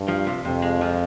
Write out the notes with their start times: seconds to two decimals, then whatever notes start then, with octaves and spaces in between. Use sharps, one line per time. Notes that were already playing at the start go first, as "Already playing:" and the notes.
Already playing: G2
0.08 F3
0.27 C3
0.45 F2 C3
0.62 G#3
0.81 F3